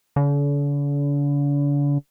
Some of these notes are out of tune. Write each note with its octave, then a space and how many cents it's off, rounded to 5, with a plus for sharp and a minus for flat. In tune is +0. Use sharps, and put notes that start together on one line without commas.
D3 -45